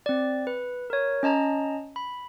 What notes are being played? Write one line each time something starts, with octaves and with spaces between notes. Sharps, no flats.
C4 D5
B4
A#4 C#5
C#4 D#5 A5 A#5
B5